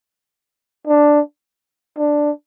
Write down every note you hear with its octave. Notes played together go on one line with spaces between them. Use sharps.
D4
D4